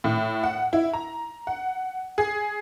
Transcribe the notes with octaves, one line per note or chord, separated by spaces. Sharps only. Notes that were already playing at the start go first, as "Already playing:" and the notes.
A2
F#5
E4
A#5
F#5
G#4